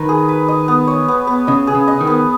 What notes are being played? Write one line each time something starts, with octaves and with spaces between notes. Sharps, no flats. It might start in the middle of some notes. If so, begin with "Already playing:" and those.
Already playing: D#3 B4
G#4
B4
D#5
B3
C#5
B3
B3
C#3 D#5
G#4
C#3
D#5
D#3
B3